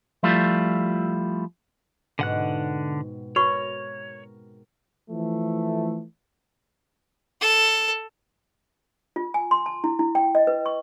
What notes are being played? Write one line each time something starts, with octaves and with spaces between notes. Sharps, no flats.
F3 G3 A3 E4 F4
G#2 B2 D3 C4 F#5 F#6
F#4 A#4 B4 C#5 C#6
E3 F3 A3
A4
F4
G#5
C6
A5
E4
E4
G5
D#5
B4
C#6